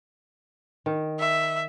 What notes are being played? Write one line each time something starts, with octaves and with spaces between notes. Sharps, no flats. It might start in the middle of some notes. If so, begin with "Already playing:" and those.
D#3
E5